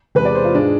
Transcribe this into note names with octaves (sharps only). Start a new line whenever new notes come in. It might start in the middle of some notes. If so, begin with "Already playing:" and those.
E2 C3 G#3 B4
D5
C5
F4
G#2 G#3 D4